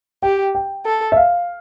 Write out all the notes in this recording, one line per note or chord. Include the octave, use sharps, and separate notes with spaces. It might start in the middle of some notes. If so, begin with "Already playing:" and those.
G4 G5
G5
A4
E5
F5